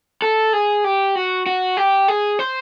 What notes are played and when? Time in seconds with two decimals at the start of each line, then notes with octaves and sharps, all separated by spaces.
0.22 A4
0.53 G#4
0.84 G4
1.15 F#4
1.46 F#4
1.77 G4
2.08 G#4
2.39 C5